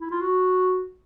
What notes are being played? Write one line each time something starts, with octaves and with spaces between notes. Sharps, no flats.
E4
F4
F#4